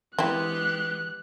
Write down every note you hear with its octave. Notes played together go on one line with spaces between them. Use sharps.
E3 G#3 B3 C4 E4 G4 F#6